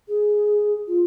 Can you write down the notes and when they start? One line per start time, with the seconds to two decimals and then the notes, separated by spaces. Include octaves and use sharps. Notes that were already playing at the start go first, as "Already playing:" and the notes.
0.08 G#4
0.87 F4